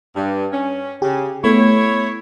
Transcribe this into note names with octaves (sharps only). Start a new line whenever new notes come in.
G2
C#4
C#3 G4
A3 B3 E4 C#5